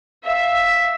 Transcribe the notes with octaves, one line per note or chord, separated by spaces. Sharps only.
E5 F5